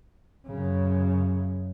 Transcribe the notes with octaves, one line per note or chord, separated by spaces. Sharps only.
F#2 C#3